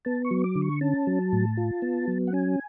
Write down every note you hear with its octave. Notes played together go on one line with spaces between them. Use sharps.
B3 A5
C#6
F#3
D6
D3
C#6
C#4 A5
F#3
A2
F4
B3
F#3
F#5
C#4 G#5